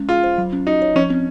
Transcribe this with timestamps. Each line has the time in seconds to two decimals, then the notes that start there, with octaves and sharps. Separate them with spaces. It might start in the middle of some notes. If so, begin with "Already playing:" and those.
Already playing: G#3 C#4
0.09 F4 G#4
0.23 C5
0.38 F#3
0.53 C#4
0.67 D#4 F#4
0.82 C#5
0.96 F3 C#4
1.10 C4